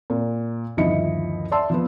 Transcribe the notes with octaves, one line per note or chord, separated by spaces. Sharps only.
A#2
G1 D#2 F3 E4 D#5 C#7
D5 E5 A5 C6 E6
F3 B3